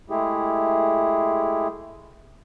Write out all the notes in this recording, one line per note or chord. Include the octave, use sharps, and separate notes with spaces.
G#3 A3 E4 G4 G#4